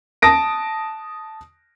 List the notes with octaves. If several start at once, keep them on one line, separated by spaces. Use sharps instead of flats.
A5 D#6 A#6 D7